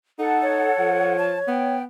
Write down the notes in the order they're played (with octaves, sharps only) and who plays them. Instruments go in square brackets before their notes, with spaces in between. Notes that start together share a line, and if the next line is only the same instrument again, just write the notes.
[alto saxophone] D#4 [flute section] A4 F#5
[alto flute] C#5
[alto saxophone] F3
[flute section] A5
[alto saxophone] B3 [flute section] G5